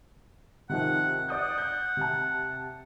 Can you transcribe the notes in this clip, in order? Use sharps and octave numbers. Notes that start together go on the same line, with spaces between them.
C3 D#3 F3 F#5
D5 F#5 D#6 G6
G6
C3 A5